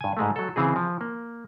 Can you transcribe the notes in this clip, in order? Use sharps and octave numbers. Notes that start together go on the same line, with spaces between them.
G2 G#5
G#2 G#3 A3
F#3 A4
C#3 E3 C4 G#4
F3
A#3